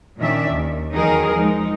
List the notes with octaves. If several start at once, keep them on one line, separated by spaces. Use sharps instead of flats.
A#2 D#3 C#4 D4 D5 E5
D#2
E2 D#3 F#3 D#4 G#4 A#4
F3 G#3 D#4